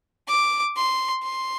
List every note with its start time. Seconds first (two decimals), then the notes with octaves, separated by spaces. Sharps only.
0.28 D6
0.76 C6
1.24 C6